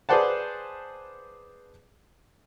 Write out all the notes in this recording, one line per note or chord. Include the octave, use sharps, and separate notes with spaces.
G#4 B4 C5 D5 F#5 A5